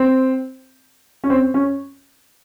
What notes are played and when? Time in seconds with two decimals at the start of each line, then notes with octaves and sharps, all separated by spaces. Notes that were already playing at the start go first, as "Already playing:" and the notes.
Already playing: C4
1.24 C#4
1.30 C4
1.54 C#4